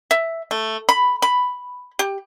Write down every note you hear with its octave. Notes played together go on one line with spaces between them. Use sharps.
E5
A3
B5
B5
G4